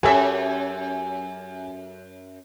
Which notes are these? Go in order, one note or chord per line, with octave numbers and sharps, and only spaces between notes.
F#2 C#4 G4 A4 E5 G#5